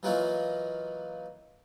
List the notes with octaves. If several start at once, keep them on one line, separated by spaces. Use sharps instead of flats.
E3 F#3 A#3 D#4 F4 F#4